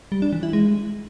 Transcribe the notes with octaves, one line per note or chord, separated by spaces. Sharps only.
G3
D4
E3
E4
G#3